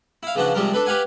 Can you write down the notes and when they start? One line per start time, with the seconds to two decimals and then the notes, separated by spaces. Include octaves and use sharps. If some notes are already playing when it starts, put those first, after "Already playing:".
0.23 E4 F5
0.35 C#3 E3 F3 D4 F#4
0.54 C3 F3 G3 G#3 A#4
0.74 D4 A4 B4
0.86 G4 B4 F5 F#5 G#5